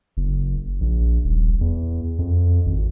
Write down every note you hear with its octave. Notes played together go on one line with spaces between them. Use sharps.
F#1
A#1
D#1
E2
F2
G#1